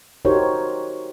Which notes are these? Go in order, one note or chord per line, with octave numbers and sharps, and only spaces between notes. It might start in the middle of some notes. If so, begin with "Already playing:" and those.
D#4 F#4 G4 A#4 C5 C#5